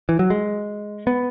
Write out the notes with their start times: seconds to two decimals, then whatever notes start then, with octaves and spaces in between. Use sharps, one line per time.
0.09 E3
0.19 F#3
0.30 G#3
1.07 B3